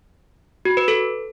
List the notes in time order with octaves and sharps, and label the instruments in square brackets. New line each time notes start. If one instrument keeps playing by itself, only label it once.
[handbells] F#4
B4
A4